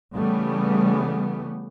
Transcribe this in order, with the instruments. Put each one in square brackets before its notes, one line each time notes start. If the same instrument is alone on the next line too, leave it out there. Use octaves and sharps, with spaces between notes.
[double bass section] C#3 E3 G3 A3 B3